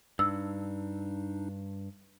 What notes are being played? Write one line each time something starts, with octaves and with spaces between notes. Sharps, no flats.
G2 D4 D#4 E6